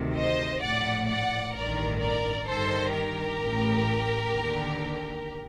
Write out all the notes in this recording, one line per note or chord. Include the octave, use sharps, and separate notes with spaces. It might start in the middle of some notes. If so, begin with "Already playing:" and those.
Already playing: D2 C3 D#3
C5 D#5
A#1 A2 D5 F#5
D5 F#5
A1 G2 D#3 A#4 D5
A#4 D5
G1 G2 D#3 A4 C5
G4 A#4
A1 A2
D#2 D3